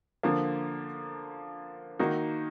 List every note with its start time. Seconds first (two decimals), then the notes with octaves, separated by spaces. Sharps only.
0.23 D3 F3 A#3
1.99 D#3 A#3 D#4 F#4